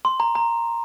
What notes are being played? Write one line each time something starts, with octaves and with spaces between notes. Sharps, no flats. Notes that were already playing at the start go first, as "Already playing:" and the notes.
C6
A#5
A#5